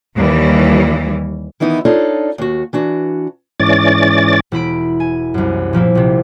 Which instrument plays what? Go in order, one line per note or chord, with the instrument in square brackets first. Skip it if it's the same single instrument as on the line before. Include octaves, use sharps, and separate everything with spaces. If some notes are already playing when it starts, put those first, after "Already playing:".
[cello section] D#2 E3 G3
[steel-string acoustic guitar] D#3 E3 B3 D#4 E4
D4 D#4 F4 A4 C#5 D5
D#2 F#4
E3 D4 F#4
[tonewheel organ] G#2 E3 C#4 D5 A6
[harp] E1 E4 B5 D7
G#5
C2 F#2
A#2 F3 A#3 E4
A#1 C3